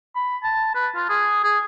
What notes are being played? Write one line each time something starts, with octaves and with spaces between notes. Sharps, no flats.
B5
A5
B4
F4
G#4
G#4